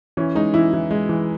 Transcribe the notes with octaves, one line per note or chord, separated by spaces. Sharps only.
E3 C#4
G#3 D#4
E3 E4
E3
G#3
E3